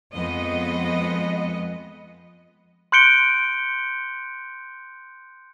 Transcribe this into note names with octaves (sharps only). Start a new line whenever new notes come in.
F2 G#3 B3 D#5
C6 F#6 G6 C#7 D7 G7